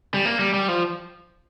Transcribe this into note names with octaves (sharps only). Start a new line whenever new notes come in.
G3
A#3
G3
G3
F3